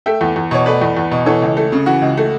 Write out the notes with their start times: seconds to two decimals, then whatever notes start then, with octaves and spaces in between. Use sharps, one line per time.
0.06 A3 E5 G5
0.21 E2
0.36 E2
0.51 B2 C#5
0.66 A3 B4 D5
0.81 E2
0.97 E2
1.11 B2
1.26 E3 A4 C#5
1.42 C#2
1.57 A3
1.72 C#3
1.86 E3 F#4
2.02 C#2
2.17 A3